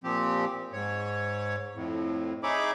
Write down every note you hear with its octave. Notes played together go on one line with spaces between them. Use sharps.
A#2 F3 C4 G4
G#2 C#5
F2 A2
D#4 G#4 C#5 E5 B5 D6